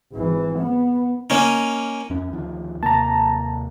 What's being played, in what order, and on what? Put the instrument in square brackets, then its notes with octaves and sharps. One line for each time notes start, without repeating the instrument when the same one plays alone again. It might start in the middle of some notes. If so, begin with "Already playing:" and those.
[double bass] G#1 E3
B3
[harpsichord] A#3 C#4 D#4
[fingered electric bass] F2 C#4
D2 D#3 F3
[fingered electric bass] D#2 C3 A#3 [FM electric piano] A5 A#5